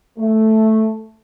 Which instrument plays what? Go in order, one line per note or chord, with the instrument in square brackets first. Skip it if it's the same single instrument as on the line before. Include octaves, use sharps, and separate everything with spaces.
[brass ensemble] A3